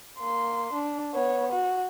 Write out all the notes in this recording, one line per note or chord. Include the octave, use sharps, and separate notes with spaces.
A#3 C6
D4
B3 C#5
F#4